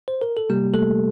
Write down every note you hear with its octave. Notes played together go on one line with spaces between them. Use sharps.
C5
A#4
A4
C3 G3 A#3 G4
A3 A4